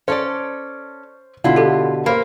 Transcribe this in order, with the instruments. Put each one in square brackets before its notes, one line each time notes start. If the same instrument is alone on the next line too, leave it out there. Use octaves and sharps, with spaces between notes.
[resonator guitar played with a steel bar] C#4 A4 D5 [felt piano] C5
[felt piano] B2 D3 [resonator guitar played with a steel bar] E4 F4
[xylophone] G4 A4
[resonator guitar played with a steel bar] A#3 [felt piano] C5 B5